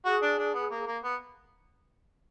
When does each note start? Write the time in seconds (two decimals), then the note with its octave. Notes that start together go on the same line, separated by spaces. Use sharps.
0.05 F#4 G#4
0.22 D4
0.38 D4
0.54 B3
0.71 A#3
0.86 A#3
1.03 B3